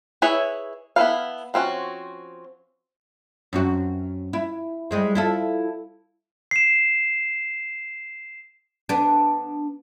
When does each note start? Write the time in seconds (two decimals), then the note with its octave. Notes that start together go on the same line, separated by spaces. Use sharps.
0.22 E4 G#4 B4 C#5 E5
0.96 B3 E4 A4 B4 F5
1.54 F3 C4 C#4 F#4
3.53 F#2 C4 F#4
4.33 E4
4.91 G3 G#3 C4
5.15 E4 F4 A4
6.51 C7 E7
8.89 B3 D4